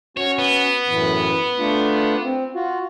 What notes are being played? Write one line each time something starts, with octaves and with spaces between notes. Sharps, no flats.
C#4 F#4 C#5
B3
F#2 A2 E3
A3 D4 F4
C4
F4 F#4